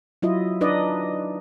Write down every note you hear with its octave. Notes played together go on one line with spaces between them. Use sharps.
F#3 E4 F4 D#5
D4 D#4 B4 D5 D#5